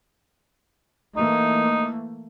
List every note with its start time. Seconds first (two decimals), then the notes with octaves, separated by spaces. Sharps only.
1.17 E3 A3 A#3 D#4